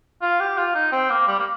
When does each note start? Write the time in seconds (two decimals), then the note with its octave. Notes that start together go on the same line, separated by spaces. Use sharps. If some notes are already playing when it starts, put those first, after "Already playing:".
0.22 F4
0.40 G4
0.57 F4
0.75 D#4
0.92 C4
1.10 A#3
1.27 G3
1.38 A#3